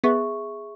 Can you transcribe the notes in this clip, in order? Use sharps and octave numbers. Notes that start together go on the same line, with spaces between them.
B3 G#4 E5 C#6